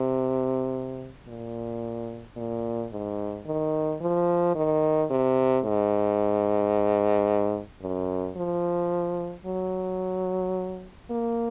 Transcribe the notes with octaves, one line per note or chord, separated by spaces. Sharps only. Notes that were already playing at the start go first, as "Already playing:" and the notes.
Already playing: C3
A#2
A#2
G#2
D#3
F3
D#3
C3
G#2
F#2
F3
F#3
A#3